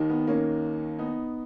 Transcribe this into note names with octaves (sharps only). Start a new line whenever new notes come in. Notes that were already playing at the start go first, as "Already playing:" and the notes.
Already playing: D#2 D#3
B3
A#3 C#4
B3 D#4